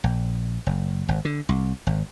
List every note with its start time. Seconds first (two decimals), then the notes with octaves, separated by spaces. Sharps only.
0.04 A#1
0.67 F#1
1.09 G#1
1.25 D3
1.49 C2
1.87 G#1